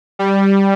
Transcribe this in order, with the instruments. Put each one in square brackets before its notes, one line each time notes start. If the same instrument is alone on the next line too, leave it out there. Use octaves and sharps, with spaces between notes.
[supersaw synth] G3